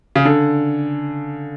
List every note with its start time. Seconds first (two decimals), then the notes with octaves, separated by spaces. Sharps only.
0.16 C#3
0.25 D3